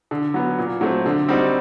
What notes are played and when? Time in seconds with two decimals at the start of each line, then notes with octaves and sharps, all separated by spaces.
0.11 D3
0.34 F#3 B3
0.58 A#2
0.81 F#3 A3 C4
1.06 D3
1.29 G3 C4 D#4 F#4